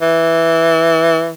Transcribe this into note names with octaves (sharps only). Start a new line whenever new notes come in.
E3